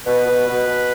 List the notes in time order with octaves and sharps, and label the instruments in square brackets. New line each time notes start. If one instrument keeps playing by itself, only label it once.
[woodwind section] B2 B4
B2
B2
B2